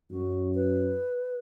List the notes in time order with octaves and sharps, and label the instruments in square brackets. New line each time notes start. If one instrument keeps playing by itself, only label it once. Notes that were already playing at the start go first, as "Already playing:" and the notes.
[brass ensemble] F#2 [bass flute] F#4
[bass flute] B4